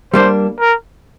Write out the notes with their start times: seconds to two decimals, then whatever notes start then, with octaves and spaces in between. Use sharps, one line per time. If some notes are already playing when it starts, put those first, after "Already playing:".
0.14 G3 A#3 D4 C5
0.60 A#4